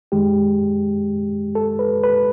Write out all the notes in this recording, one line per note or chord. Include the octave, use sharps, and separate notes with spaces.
F#2 D#3 G#3 G4
A4
B4
B4